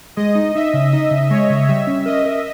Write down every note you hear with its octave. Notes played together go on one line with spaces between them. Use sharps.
G#3 D#5
D#4
D#4 E5
C#3
D#4 D#5
C#3
G#3 C#5
C#3
G3 E5
C#4
A#4 D#5
A#4